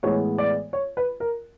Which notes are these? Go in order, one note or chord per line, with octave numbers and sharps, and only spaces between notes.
A2 E3 G#3 B3 C#5
D5
C#5
B4
A#4